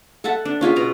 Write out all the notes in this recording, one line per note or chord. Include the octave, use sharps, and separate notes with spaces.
A4 E5 F#5 A5
D4
C#4 F4 G#4 E5
B2 A#5